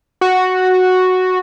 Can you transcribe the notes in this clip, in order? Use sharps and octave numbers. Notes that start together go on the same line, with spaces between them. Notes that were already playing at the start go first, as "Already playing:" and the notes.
F#4